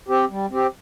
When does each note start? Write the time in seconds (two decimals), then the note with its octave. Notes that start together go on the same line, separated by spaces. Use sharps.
0.08 C4 G4
0.30 G3
0.50 C4 G4